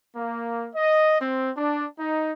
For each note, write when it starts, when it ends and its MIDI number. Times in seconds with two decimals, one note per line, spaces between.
0.17 0.68 58
0.73 1.15 75
1.21 1.50 60
1.56 1.85 62
1.98 2.31 63